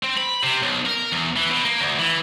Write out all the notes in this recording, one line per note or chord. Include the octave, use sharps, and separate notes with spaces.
C4
B5
C3
B1
A#4
E2
E3
B2
A#3
D2
E3